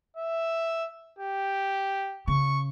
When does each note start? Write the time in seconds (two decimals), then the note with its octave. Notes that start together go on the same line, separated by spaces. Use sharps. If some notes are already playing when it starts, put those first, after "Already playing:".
0.17 E5
1.19 G4
2.28 C#3 C#6